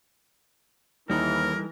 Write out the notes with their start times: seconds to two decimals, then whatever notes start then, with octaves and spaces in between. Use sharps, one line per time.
1.10 D#2 E3 G3 D#4 A4 A#4